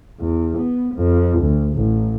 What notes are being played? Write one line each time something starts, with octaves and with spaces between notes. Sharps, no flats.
E2
B3
F2
D2
A1